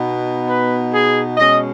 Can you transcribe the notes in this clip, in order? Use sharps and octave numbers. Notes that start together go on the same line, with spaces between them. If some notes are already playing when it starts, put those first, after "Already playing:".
Already playing: B2 B3 D#4
B4
G#4
B2 G#3 C#4 D#5